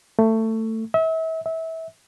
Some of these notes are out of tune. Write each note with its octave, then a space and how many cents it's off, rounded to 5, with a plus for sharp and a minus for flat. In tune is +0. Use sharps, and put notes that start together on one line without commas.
A3 +20
E5 -35
E5 -25